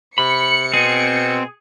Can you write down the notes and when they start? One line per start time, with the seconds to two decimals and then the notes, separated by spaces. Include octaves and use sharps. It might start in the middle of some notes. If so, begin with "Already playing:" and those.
0.18 C3 B5 C#7
0.74 B2 C4 G#4